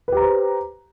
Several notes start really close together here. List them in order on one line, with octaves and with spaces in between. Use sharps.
B4 G4 A#5 C5